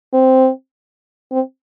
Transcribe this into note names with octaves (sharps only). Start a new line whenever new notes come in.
C4
C4